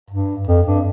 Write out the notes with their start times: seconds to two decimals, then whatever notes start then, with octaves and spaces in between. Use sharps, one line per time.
0.10 G2
0.47 F2
0.67 G2